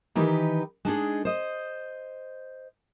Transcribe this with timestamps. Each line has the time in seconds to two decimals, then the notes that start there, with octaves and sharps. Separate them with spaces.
0.15 D#3 E3 D#4 G4 B4
0.85 G#3 D4 D#4 G#4
1.25 C5 D#5